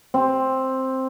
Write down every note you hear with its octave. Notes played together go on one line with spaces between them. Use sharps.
C4